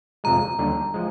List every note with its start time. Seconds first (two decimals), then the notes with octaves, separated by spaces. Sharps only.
0.24 F2 C3 F3 G#3 A#5
0.59 D#2 D3 G3 D4
0.94 F3 G#3